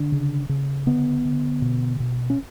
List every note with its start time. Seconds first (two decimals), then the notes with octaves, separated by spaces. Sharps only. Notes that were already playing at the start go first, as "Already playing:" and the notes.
Already playing: D3 D4
0.12 C#3
0.49 C#3
0.86 D3 B3
1.25 D3
1.62 B2
2.00 B2
2.30 C#4